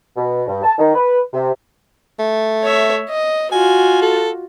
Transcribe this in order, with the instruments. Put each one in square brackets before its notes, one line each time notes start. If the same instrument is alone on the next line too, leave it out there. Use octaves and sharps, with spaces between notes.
[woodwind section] B2
G2
A5
D#3
B4
C3
[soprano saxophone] A3
[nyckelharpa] C#5 E5
D#5
[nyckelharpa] F4 F#4 [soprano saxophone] G#5
[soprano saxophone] A4